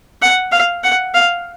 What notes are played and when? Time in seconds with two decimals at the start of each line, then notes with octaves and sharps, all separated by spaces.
0.22 F#5
0.52 F5
0.84 F#5
1.14 F5